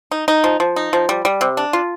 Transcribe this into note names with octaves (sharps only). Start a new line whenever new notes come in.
D#4
D#4
F3
F3
D#4
F3
G3
G3
C3
D4
F4